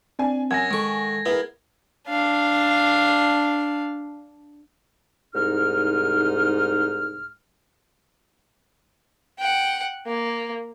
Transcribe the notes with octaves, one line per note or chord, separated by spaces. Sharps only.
C4 D4 G#5
F#2 F#5 G#5 G#6 A#6
D#3 G#3 A4 C#6
B3 E4 G#4 A#4 B4
D4 F5
C2 G#2 D#4 F6
F#5 G5
A#3